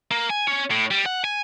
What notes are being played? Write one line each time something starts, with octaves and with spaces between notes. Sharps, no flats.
A#3
G#5
C#4
A2
G3
F#5
G#5